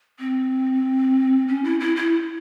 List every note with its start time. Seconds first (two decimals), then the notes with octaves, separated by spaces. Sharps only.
0.19 C4
1.48 C#4
1.64 E4
1.80 E4
1.96 E4